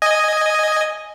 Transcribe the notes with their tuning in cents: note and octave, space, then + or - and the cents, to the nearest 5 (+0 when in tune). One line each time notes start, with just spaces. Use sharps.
D#5 +0 G#5 +0